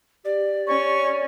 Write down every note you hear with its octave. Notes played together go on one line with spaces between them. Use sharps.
G4 D5
C#4 C#6